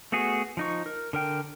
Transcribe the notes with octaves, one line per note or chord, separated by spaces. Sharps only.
A3 B3 F#4 G#4
F3 D#4 C#6
A#4
D3 A#4 G5